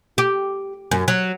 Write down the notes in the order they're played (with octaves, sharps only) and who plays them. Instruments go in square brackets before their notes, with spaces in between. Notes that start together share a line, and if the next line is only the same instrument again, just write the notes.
[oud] G4
F#2
F#3